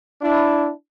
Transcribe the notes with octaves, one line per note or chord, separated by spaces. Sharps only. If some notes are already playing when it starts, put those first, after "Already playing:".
D4 E4